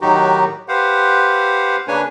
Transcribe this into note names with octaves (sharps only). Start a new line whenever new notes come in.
A2 D#3 F#3 D#4 F#4 G4
G4 B4 C5 F5 F#5
C#3 A#3 D4 B4 C#5 G#5